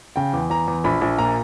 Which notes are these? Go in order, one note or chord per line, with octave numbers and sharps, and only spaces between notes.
C#3 G5
E2
E2 A#5
E2
A#1 B5
A#1
A#2 A#5